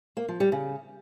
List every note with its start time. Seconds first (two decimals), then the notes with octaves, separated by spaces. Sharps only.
0.17 A#3
0.28 F3
0.40 G3
0.52 C#3